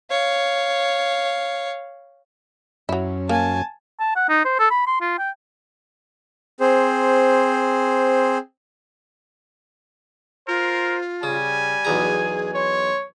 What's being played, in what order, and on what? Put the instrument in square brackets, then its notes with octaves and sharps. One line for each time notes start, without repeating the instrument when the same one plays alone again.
[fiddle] C#5 F5
[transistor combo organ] F#2 C#4 [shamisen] F#3 E4
[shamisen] A#3 [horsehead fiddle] G#5 A5
[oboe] A5
F#5
D#4
C5
A4
B5
C6
F4
G5
[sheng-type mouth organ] C4 G#4 C5
[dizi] F4 [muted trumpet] A#4 [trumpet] C5
[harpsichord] C#3 [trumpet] G3 [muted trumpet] G#5
[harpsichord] B1 E2 A#5 [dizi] G#4
[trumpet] C#5 [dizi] C6